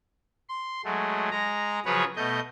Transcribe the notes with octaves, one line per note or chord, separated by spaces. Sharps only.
C6
F#3 G#3 A3
G#3 A#5
C#3 F3 F#3 G#4 B4 C#5
B2 A3 D#5 G6